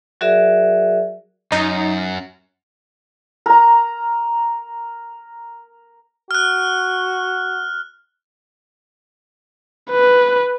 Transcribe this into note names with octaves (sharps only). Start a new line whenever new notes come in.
F#3 F#4 G#4 A#4 D5 E5
F#2 D#4
A#4 A#5
F#4 F6 F#6
B4